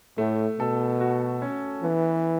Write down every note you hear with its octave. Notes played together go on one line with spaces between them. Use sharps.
A2 A3
B2 A4
F#4
C#4
E3 B3